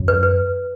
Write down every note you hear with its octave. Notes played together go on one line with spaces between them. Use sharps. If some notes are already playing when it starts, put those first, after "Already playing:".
Already playing: F#2
B4
B4